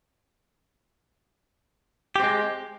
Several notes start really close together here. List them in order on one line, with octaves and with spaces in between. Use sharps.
G4 C4 G#3